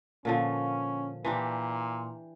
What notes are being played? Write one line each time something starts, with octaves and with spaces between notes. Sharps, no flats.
A#2 D3 F3 C#4
A#2 E3 D4 G4